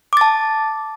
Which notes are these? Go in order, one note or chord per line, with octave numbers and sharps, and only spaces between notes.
A5 D6 A6